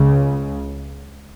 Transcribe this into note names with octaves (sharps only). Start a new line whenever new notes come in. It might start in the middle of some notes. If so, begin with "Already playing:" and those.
Already playing: C#2 C#3